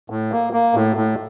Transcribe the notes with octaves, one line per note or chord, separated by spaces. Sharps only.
A2
A#3
A#3
A2
A2